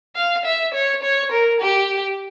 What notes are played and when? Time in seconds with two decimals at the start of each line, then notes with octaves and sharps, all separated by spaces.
0.16 F5
0.45 E5
0.74 C#5
1.03 C#5
1.32 A#4
1.60 G4